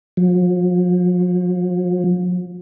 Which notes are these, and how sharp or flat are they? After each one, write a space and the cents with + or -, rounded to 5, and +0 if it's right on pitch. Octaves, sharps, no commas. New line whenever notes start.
F3 +45